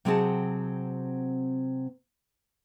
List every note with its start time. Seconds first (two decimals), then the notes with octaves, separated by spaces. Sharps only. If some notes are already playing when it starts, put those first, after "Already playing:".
0.05 C3 F#3 C4 F#4 G#4 A5